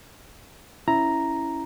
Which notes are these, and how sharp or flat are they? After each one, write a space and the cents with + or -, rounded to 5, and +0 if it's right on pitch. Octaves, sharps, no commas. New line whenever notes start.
C#4 +0 E4 +0 A#5 +0